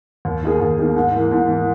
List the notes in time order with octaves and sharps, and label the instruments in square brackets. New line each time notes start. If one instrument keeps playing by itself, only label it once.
[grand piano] D#2
D#3 A#3 D#4 G#4
D#2
D#3 A#3 D#4 G#4
G#2
E3 A#3
G#2
E3 A#3